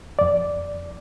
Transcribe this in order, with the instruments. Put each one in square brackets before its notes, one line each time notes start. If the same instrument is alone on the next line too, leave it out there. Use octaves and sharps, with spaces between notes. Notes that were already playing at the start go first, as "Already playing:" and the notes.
[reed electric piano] F2 D5